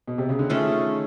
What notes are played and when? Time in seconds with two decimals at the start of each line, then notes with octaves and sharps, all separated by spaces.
0.08 B2
0.18 C3
0.29 C#3
0.39 D3
0.49 D#3 A3 C#4 F4 G#4